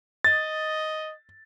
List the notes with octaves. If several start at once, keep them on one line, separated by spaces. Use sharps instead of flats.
D#5 A6